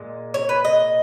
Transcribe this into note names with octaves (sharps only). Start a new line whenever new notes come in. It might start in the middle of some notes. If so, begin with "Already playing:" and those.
Already playing: A#2 G#3
C#5
B4
D#5